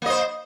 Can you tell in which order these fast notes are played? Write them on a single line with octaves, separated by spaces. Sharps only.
A#3 D#5 C5